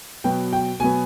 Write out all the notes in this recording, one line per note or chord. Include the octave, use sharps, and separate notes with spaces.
B2 F#3 B3 G5
G5
B2 F#3 B3 G#5